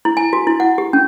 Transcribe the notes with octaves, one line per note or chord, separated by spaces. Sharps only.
E4
G#5
F#4
E4
F#5
G4
C#4